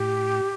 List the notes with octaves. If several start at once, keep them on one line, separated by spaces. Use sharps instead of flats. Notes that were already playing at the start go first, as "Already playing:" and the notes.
Already playing: A2 G4